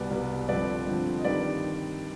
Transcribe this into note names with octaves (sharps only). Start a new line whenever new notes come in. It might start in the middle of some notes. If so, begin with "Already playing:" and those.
Already playing: C2 B2 G3 B3 B4 D5
C2 B2 G3 B3
G2 D3 F3 C4 B4 D5
G2 D3 F3 C4
D#5
G2 D#3 G3 C4 D#4 B4 D5